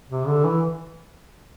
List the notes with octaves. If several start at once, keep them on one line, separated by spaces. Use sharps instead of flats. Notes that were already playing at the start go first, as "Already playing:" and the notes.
C3
D3
E3